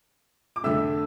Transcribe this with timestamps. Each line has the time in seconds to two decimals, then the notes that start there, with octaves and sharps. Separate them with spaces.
0.56 D6
0.64 F2 D3 A3 E5 E6